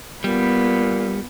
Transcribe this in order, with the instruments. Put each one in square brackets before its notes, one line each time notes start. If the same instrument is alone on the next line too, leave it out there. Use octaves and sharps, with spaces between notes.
[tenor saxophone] A#2 [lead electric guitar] G3 [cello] B3